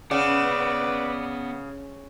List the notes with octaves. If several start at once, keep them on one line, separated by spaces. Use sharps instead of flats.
C#3 B3 D5 F#5